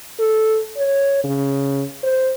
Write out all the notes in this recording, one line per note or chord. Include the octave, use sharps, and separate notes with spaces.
A4
C#5
C#3
C5